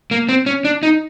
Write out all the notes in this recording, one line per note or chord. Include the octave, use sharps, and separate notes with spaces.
A#3
C4
C#4
D4
D#4